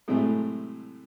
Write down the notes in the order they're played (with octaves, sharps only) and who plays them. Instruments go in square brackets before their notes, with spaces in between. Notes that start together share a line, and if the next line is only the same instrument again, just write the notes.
[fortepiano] A2 C3 F#3 G#3 A3